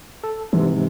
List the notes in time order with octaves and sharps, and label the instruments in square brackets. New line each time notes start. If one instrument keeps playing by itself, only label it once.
[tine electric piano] A4
[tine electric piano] G#2 C3 [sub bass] E3